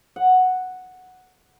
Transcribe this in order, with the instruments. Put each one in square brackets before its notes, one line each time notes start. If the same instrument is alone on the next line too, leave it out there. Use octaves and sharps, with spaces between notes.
[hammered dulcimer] F#5